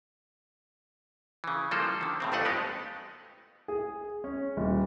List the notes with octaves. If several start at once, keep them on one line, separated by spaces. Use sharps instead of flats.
C#3 E3
E3 F3 G3 A#3 A4 C5
D3 D#3
A2 C#3 C4
G1 F2 A3 D4 D#5 F#5
G#3 B3 D#4 G4
G#4
C#4
D#1